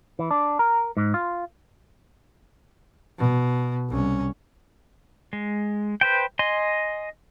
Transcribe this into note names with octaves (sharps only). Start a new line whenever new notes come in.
E3
D4
A#4
G#2
F4
B2
C2 C#4
G#3
B4 C5 G5
D#5 G#5 C6